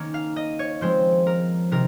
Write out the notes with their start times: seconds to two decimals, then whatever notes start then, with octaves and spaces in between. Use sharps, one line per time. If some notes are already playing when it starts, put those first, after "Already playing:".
Already playing: D#3 A#3 C#4
0.14 F5
0.36 D#5
0.59 C#5
0.81 F3 G#3 C4 C5
1.27 A#4
1.71 C3 D#3 A#4